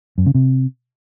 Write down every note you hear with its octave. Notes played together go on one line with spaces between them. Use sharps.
F#2
C#3
C3